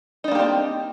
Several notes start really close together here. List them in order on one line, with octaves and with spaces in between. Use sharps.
D#4 D4 A#3 G4 C4